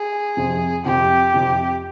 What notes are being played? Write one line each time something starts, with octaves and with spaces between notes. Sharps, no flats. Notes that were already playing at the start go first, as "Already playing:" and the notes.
Already playing: G#4
F2 C3 F3
F2 C3 F3 G4
F2 C3 F3